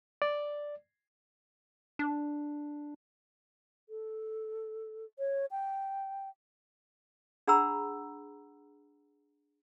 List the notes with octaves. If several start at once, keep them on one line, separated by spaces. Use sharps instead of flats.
D5
D4
A4
C#5
G5
D4 G#4 F#5 A#5 B5 E6